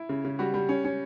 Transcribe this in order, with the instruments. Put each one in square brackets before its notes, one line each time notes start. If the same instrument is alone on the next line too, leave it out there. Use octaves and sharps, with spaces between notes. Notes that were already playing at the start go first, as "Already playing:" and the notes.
Already playing: [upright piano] E4
C#3
C#3
G3 F#4
G3
C#4
C#4